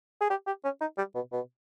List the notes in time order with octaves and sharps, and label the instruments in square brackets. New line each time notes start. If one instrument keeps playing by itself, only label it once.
[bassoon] G#4
G4
G4
C#4
D#4
G3
B2
B2